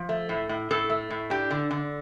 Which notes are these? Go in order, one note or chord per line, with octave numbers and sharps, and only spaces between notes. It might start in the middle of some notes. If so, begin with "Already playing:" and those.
Already playing: F3
A3
A2
A2
A2 A4
A3
A2
D4 G4
D3
D3